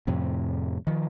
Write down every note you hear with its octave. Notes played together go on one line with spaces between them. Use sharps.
F2 A2 C3
D#3 F3